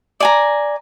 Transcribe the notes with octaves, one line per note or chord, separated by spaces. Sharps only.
D5 G#5 A#5